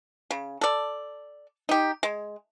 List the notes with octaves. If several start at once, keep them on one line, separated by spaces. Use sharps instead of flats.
C#3
A4 D5
D#4 G4
G#3